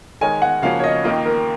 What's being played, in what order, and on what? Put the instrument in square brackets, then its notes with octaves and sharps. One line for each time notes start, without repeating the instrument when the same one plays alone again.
[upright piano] D#3 G#3 D#4 A#4 C#5 [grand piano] G#5
[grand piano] F#5
[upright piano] C#3 F3 A#3 C#4 F#4 [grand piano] F5
[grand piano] C#5
D#5
[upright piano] D#2 D#3 A#3 F4 [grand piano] D#5
[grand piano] A#4